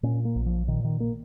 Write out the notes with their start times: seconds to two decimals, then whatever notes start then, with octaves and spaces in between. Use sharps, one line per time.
0.03 A#2 C#4
0.25 A#3
0.35 A#1
0.46 F3
0.68 A#2 D#3
0.84 D#3
1.00 A#3